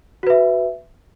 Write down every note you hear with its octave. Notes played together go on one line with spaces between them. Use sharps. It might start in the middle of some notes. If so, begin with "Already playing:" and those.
F#4 B4 E5